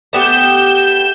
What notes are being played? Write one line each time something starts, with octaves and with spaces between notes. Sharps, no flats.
A3 B3 G4 G6 E7